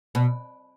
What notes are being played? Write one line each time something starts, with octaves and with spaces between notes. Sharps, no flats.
B2